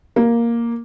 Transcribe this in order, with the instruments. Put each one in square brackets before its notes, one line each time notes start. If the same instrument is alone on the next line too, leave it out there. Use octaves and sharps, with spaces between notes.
[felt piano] A#3